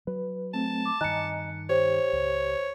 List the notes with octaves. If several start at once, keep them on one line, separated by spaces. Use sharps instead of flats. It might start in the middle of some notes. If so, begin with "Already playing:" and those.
F#3 B4
A3 C4 A5
D6
G2 D#3 D#5 G#5 A#5 F#6 C#7
G4 C5 C#5
C#2